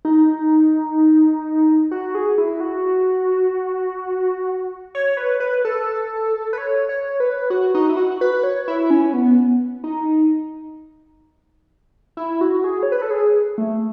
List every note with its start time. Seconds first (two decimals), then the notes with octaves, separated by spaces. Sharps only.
0.05 D#4
1.91 F#4
2.15 G#4
2.38 E4
2.60 F#4
4.95 C#5
5.17 B4
5.40 B4
5.65 A4
6.53 B4
6.58 C#5
6.89 C#5
7.20 B4
7.50 F#4
7.75 D#4
7.89 E4
7.97 F#4
8.21 B4
8.43 C#5
8.68 E4
8.90 C#4
9.13 B3
9.84 D#4
12.17 E4
12.41 F#4
12.64 G#4
12.83 C#5
12.92 B4
13.02 A4
13.11 G#4
13.58 A3